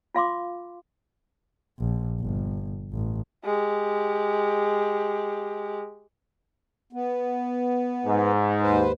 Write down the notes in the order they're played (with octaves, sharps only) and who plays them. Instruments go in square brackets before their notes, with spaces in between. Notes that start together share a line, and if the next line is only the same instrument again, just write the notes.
[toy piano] F4 F5 C6 D6
[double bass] A#1
G1
A1
[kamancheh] G#3 G4
[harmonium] B3
[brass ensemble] G#2
[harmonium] D#2 B4 C5